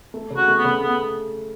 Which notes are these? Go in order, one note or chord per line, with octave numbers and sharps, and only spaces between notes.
A3
C#3
F#4
A3
B3
C#3
A3 B3